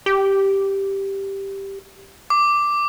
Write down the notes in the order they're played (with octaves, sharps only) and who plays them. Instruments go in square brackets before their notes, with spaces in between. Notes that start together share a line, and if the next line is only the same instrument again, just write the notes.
[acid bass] G4
[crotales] D6